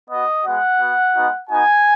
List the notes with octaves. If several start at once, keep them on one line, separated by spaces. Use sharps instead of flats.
B3 F#4 D#5
G#3 B3 F#4 F#5
B3 F#4
G#3 B3 D#4 F#4
B3 D#4 F#4 G#5